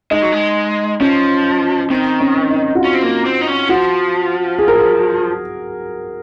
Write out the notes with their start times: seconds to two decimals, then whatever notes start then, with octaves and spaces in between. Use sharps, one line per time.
0.11 G#3 D#4
0.22 F#3
0.32 G#3
1.00 F3 C#4
1.90 D#3 C4
2.21 C#4
2.50 D#4
2.75 F#4
2.80 C#4 F4
2.94 C4
3.03 A#3
3.25 C4
3.41 D#4
3.47 C#4
3.69 F3 F#4
4.59 G#4
4.68 A#4
4.76 G#4